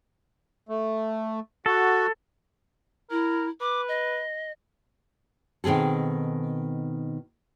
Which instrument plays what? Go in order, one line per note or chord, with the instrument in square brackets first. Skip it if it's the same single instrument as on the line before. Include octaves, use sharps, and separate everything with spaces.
[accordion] A3
[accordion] F#4 [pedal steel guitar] A4
[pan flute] E4 [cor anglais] A#4
[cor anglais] B4 [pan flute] D6
[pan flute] D#5
[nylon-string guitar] B2 D#3 C4 G#4 A4